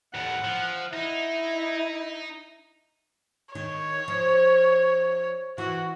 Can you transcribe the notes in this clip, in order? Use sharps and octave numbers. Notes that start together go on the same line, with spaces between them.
D#2 A2 F#5
F3
D#4 E4
D#3 C#5
F3
E3 F#4